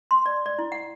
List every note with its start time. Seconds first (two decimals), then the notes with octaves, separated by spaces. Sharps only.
0.11 C6
0.26 D5
0.46 D5
0.59 E4
0.72 F#5